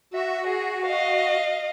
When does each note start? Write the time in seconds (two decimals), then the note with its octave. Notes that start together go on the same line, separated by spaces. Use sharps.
0.13 F#4 E5
0.47 G#4
0.84 D#5 F5